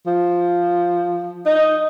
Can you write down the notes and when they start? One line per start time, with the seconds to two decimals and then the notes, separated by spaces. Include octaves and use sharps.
0.07 F3
1.46 D#4